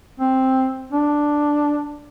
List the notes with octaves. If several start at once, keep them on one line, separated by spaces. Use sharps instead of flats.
C4
D4